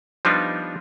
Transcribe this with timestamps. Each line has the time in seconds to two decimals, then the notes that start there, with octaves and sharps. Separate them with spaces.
0.25 F3 G3 B3 D4 D#4 F4